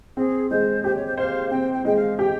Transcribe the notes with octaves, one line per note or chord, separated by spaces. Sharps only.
C4 G#4
G#3 C5
G4 C5
C#5
C5
C5 F5
C4 G5
G5
G#3 G5
F5
G4 G5